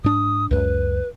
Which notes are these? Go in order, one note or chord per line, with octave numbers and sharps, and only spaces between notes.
G#2 D4 D#6
C#2 F#2 B4